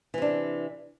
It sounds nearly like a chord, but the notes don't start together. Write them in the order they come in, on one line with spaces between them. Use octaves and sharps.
E3 C3 D4